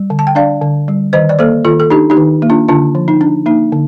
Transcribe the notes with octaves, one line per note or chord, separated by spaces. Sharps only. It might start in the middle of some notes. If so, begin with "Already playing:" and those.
Already playing: G3
D3
A5
G5
D4 D5 F5
D3
G3
D#3 C5 D#5
D5
A#3 A4 C5
D#3 F4 A4
A4
D4 D#4 G4
D#4 G4
D#3
A#3
D4 F4
D3 D4 F4
F3
D#4
D4
A#3 D#4
D3